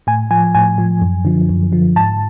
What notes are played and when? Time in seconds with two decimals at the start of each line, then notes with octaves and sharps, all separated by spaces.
0.07 A2 G#5
0.31 F3 G#5
0.55 A2 G#5
0.78 F3
1.02 F#2
1.25 D3 F3
1.49 F#2
1.72 D3 F3
1.96 G#2 A5